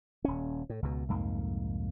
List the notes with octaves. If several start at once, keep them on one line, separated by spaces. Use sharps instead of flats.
D#1 C#4
A2
C#2 B2
C2 F2 G#2 A#3